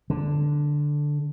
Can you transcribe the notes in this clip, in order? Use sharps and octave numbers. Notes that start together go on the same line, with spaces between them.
D3